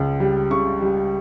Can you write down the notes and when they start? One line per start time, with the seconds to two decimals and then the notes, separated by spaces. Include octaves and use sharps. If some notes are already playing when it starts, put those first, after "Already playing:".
Already playing: C#2
0.20 G3
0.51 C#3 C#6
0.81 G3